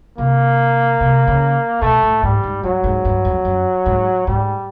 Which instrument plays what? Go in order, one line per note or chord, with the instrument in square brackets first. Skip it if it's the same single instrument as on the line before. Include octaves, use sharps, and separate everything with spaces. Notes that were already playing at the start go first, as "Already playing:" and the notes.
[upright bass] C3 [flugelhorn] A#3
[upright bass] C3
C#3
[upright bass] B2 [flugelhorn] A3
[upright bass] A2
[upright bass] G#2 [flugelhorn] G3
[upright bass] G#2
[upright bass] G2 [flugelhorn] F#3
[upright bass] G#2
G2
F2
F#2
G#2
[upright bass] G#2 [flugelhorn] G3